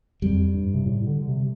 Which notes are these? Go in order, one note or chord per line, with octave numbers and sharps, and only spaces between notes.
F2 G3
G2
C3
A2
D3
C3